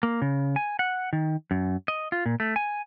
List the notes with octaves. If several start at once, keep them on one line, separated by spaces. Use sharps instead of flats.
A#3
C#3
G#5
F#5
D#3
F#2
D#5
F4
A#2
A3
G#5